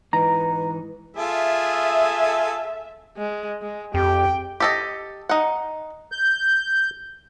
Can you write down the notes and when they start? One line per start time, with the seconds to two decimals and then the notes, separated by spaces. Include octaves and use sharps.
0.13 G#2 E3 D#4 B4 A#5
1.17 F4 G#4 A4 E5
3.17 G#3
3.62 G#3
3.94 F2 G4 G5
4.60 G4 A4 D#5
5.29 D#4 F#5
6.12 G6